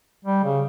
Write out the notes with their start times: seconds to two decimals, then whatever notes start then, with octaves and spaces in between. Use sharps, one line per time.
0.25 G3
0.43 C#3